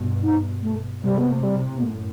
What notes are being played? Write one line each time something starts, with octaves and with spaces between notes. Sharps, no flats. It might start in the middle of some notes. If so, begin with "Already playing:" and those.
Already playing: G2 B2
D#4
A3
A2 C3 G3
B3
A3
G3
B3
F#2 A2 A3